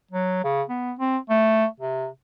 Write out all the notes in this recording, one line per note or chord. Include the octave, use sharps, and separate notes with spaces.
F#3
C#3
B3
C4
A3
C3